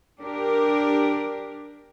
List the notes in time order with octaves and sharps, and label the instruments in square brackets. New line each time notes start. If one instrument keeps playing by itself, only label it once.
[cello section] D4 G4 A#4